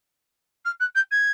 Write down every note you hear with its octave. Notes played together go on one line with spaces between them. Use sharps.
F6
F#6
G6
G#6